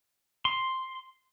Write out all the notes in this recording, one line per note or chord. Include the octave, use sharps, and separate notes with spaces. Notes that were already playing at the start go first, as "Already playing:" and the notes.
C6